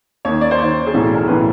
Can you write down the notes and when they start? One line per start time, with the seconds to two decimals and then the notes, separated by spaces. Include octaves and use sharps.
0.25 D#2 D#3 C#5
0.41 D5
0.51 C5
0.59 D#2 D#3 C#5
0.87 G#4
0.94 B1 A2 E3
1.01 A4
1.14 A#4
1.27 B1 A2 E3 B4